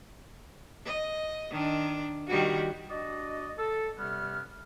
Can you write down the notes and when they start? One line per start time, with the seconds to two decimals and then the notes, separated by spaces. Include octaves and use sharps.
0.86 D#5
1.51 D#3 D4
2.28 D#3 G3 F#4
2.90 D4 F#4 D5 D#5
3.57 A4
3.98 C3 G3 B3 C#4 F6